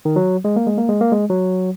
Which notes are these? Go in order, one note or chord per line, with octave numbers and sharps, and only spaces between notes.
D#3
F#3
G#3
A#3
G#3
A#3
G#3
A#3
G#3
F#3